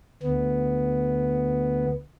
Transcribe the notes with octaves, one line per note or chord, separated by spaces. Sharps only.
D2 B3